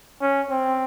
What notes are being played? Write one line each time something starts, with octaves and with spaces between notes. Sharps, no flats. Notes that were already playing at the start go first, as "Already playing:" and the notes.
C#4
C4